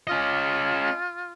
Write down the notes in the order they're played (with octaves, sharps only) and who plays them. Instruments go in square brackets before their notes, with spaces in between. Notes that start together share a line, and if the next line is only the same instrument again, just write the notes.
[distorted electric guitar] C#4 D#5 [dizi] F4